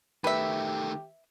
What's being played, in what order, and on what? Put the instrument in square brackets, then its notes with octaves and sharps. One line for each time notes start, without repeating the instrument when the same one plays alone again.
[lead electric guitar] D#3 A3 [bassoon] G4 [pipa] B4 E5